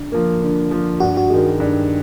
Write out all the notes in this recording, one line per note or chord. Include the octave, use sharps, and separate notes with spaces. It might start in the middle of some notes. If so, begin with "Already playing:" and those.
Already playing: D3
F3 A#3
D3
F3 A#3
G2 F#4
F#4
D#3 G#3
G2